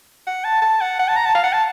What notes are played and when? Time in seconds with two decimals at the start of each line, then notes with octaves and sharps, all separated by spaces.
0.27 F#5
0.44 A5
0.62 A5
0.81 F#5
0.99 F#5
1.08 A5
1.16 A#5
1.26 A5
1.35 F5
1.44 F#5
1.53 A5